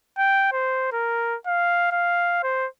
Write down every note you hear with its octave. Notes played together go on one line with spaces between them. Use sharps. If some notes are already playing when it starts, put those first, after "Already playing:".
G5
C5
A#4
F5
F5
C5